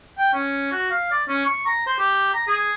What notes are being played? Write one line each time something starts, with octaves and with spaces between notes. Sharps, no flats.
G5
C#4
F#4
F5
D5
C#4
C#6
A#5
C5
G4
A#5
G#4